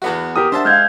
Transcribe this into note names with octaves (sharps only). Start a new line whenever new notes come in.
E2 B3 F#4
G4 A#4 D#6
D4 C5 E5 F#5 A5
G#3 F5 F6 G6 G#6